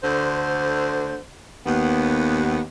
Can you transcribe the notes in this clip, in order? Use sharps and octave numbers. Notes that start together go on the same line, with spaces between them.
D2 D3 C5
D#2 B3